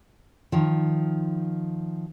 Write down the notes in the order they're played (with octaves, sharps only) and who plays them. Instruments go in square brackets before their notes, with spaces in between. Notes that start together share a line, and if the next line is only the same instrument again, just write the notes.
[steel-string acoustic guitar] D#3 F3